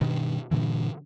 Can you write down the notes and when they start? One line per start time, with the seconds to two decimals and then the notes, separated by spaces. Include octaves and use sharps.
0.01 G2 B2 D#3
0.51 G2 A#2 D3 E3